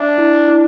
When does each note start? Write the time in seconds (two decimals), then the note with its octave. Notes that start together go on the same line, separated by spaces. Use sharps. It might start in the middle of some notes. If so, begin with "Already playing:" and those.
Already playing: D4 E5
0.18 E4
0.48 E4